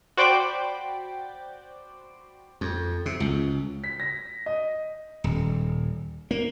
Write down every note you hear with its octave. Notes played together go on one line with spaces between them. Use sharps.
F#4 C5 D5 G5 B5 D6
F2
C3
C#2
B6
A#6
D#5
D#1
A#3